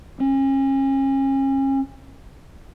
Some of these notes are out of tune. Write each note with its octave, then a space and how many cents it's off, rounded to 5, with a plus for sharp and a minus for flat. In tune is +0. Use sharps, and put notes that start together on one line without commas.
C#4 -35